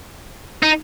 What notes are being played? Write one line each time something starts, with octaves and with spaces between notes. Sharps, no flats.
D#4